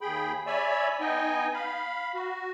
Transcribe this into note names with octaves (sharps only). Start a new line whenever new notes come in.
D#2 G#4 G5 B5
C#5 D5 E5 G#5 B5 E6
B3 D#4 D#5 G5 G#5
F5 B5
F#4